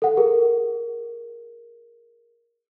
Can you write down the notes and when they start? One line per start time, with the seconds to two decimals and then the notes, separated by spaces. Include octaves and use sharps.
0.02 A4 F#5
0.17 G#4 A#4